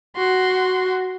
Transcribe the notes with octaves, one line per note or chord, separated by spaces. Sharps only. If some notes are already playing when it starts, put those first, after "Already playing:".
F#4 C6